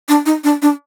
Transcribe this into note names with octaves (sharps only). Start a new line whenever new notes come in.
D4
D#4
D4
D4